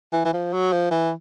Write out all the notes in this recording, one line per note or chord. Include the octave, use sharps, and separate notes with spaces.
E3
E3
F3
F#3
F3
E3